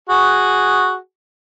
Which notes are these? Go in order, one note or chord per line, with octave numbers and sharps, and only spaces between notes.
F#4 G#4